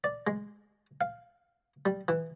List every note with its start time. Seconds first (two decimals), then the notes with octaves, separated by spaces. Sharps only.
0.04 D5
0.27 G#3
1.01 F5
1.85 G3
2.08 E3